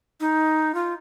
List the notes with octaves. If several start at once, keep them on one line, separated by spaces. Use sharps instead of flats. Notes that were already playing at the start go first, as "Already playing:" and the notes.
D#4
F4